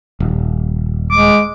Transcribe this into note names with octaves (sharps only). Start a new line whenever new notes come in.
D#1
G#3 D6